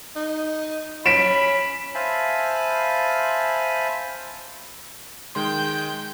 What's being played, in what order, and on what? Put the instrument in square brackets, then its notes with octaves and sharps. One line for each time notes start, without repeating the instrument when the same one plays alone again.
[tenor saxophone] D#4
[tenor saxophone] C#4 [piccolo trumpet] B5 [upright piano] B6 D7 E7
[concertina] C5 E5 F5 G#5 A5 B5
[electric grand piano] D#3 G#3 C6 [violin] G5 G6